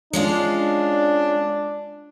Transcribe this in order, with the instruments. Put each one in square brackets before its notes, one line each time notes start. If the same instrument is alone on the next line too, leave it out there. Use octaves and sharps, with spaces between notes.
[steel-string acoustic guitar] G#3 C#4 F4 [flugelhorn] D4